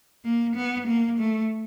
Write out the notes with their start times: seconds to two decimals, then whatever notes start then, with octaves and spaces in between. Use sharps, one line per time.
0.24 A#3
0.55 B3
0.87 A#3
1.19 A3